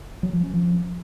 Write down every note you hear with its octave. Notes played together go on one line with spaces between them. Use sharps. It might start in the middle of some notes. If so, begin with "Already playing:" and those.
F#3
F3
C#4
F3